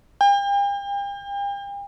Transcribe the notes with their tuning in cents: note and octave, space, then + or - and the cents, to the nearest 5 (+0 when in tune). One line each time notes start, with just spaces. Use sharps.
G5 +40